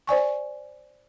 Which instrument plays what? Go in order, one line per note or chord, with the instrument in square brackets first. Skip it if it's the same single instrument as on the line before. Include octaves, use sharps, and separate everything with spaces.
[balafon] C5 D5 G#5 C#6